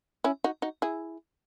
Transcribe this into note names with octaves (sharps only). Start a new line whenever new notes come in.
C#4 E4
D#4 F#4
D#4 F#4
E4 G#4